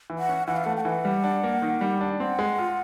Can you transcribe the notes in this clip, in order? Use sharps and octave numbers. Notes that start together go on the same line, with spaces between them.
E3
F#5
C#4
E3 F#5
F5
A3 F#5
G5
E3 F#5
G3
D4
A#3
D#3
G3
D4
C4 F#5
G#3
F4